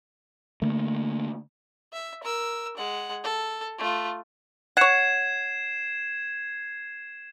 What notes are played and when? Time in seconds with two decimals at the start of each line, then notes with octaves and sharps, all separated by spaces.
0.62 D3 A3 A#3
1.93 E5
2.23 A#4 E6
2.77 G#3 F#5
3.24 A4
3.78 A3 F4
4.77 C#5 F#5 G#6 C7 E7